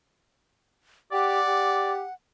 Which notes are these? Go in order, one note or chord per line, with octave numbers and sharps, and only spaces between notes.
G4 D5 F#5
G4